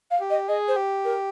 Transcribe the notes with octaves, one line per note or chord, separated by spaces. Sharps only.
F5
G4
D#5
G#4 D#5
C5
G4
A#4